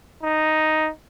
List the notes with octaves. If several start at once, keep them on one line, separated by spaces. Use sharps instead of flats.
D#4